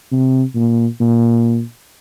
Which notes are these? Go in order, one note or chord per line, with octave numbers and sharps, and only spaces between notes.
C3
A#2
A#2